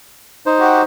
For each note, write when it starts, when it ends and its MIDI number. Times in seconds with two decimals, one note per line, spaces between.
0.46 0.84 63
0.46 0.84 72
0.59 0.82 66
0.59 0.82 67